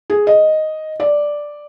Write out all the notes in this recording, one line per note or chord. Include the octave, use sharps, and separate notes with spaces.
G#4
D#5
D5